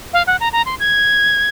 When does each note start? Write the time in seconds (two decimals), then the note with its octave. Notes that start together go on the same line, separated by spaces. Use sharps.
0.13 F5
0.27 F#5
0.40 A#5
0.53 A#5
0.66 C6
0.80 G#6